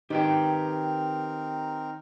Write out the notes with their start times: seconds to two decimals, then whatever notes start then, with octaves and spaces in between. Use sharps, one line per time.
0.10 D#3 C4 D#4 G4 A#4 B4 G5